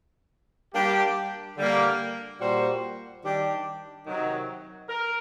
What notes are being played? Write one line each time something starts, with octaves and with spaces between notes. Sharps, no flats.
G3 A#3 D4 G4
D3 G3 A#3
A#2 G3 A#3 F#4 C5
D#3 G3 D4 G4
C3 D#3 F#3
A#4